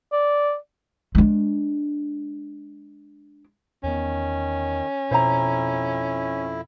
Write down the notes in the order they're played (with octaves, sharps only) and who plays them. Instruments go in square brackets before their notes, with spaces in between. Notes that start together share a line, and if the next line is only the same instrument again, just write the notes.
[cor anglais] D5
[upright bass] G#3 D4
[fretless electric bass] E2 B3 [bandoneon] D#3 [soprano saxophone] C#4
[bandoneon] F2 E4 [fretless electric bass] B2 [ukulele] C5 E5 A#5